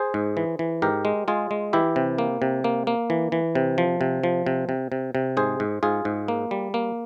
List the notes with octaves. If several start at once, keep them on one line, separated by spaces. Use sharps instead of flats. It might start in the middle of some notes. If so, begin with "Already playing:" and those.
Already playing: G#4 C5
G#2
E3
E3
G#2 G4 A#4
G#3
G#3 F4 G#4
G#3
E3 E4 G4
C3
A#3
C3
A#3
A#3
E3
E3
C3
F3
C3
F3
C3
C3
C3
C3
G#2 G#4 C5
G#2
G#2 F4 G#4
G#2
A#3
G3
A#3